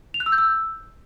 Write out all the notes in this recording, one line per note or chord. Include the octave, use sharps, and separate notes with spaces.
F7
F#6
E6
G6
E6